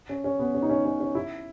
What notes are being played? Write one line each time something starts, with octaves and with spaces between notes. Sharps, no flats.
C#4
C#4
B3
C#4
D#4
C#4
C#4
C#4
E4